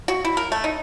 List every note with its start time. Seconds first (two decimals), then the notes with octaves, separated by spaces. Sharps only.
0.08 F#4
0.24 E4
0.37 A#4
0.52 A3
0.64 D#4